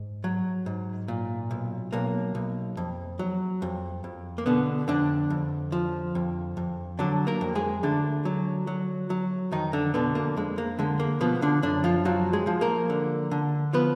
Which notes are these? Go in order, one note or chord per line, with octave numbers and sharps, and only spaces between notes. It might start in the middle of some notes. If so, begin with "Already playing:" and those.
Already playing: G#2
F#3
G#2
A#2
B1
B1 A#3
B1
F2
F#3
F2
F2
A#3
B2 D3 B3
F2 D3 D4
F2
F3
F2
F2
D3 F#3 D4
A#3 A#4
F2
G#3 G#4
D2 D3 D4
F#3
F#3
F#3
F2 D#3 D#4
D3 D4
B2 D3 B3
A#3
F2 G#3
A#3
D3 G#3
A#3
B2 F3 B3
D3 D4
F#2 D3 D4
F3 F4
F3 F#3 F#4
G#3 G#4
F3
A#3 A#4
D3
D3
F3 B3 B4